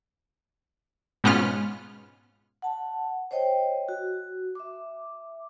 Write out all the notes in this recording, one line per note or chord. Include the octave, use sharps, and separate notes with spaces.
G#2 B2 B3 C#4 F4 F6
F#5 A5
C5 C#5 D#5 G5
F#4
E5 D6